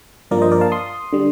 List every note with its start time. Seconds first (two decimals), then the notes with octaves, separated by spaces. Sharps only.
0.31 G2 F3 A#3 A#4 D5
0.42 C5 D#5
0.51 A#4 D5
0.61 F5 A5
0.72 C6 D#6
1.13 D3 G3